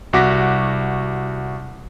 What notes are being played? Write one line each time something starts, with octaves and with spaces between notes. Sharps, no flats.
C2 F#4 F#5 D6 A#6 B6